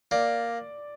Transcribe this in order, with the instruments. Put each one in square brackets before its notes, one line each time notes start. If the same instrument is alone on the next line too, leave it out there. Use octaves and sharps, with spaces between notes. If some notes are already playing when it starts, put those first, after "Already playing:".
[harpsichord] A#3 [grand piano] D5